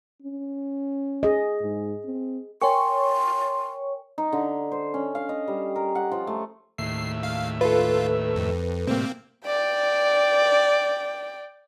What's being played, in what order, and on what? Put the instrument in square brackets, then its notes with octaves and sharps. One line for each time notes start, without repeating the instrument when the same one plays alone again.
[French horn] C#4
[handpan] G#4 D#5
[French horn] G#2
C4
[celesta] A#4 G5 G#5 [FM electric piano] C#5 C#6 [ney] C6
[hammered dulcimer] D#4
D3
C5
C#4
F5
D#5
G3
A#4
F#5
F3
A3
[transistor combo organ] D#2 A2 E5 [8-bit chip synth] C7
[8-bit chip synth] F5
[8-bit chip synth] F4 [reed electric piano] A4 B4
[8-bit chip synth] F2
[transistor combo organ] A2 C3 G3 [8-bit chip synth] A#3 C4
[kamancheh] D5 G5